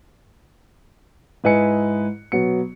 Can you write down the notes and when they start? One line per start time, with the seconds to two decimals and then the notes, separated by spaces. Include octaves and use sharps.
1.44 G#2 E4 B4 D#5 G#5 C#7
2.32 B2 F#3 B3 C#7